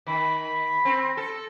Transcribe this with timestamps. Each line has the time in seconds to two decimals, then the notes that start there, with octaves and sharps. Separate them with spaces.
0.06 D#3 B5
0.85 C4
1.17 A4